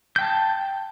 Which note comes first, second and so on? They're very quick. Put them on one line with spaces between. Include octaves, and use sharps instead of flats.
G6 G5 A5